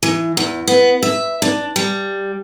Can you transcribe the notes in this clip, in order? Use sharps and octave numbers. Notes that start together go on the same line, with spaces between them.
E3
E2
B3
E5
D4
G3